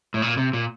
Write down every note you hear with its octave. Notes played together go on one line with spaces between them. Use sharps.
A2
A#2
C3
A#2